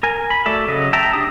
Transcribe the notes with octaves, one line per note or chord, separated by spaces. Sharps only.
A#4 G#5
B5
A3 F#4 A4 D5 E5
C#3 F#3 D#5
E5 G5 A5 A#5
D4 G4 D#6